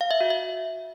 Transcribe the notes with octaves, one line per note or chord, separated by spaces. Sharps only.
F5
E5
F#4
E5